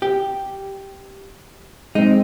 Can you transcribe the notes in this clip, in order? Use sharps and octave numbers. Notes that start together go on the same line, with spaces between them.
G4
G#3 C4 D#4